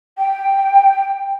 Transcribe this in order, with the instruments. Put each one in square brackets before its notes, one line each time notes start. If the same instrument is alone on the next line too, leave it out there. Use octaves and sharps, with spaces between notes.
[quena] G5